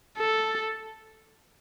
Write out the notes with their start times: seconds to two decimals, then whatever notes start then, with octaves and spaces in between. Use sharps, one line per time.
0.18 A4